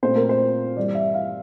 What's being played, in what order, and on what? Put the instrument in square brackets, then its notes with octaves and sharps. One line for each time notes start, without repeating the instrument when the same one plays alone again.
[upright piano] A#2 A3 C4 C5
A#4
C5
G2 E3 G3 A#3 D5
E5
F5